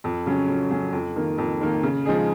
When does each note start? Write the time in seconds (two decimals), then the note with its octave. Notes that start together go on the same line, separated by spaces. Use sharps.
0.04 F2
0.26 C#3 F#3 C#4
0.48 F2
0.71 C#3 F#3 C#4
0.93 F2
1.16 D#3 A#3
1.38 F2
1.61 D#3 A#3
1.83 C#3
2.05 F3 G#3 D#4 G#4